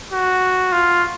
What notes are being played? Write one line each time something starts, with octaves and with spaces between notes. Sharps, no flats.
F#4
F4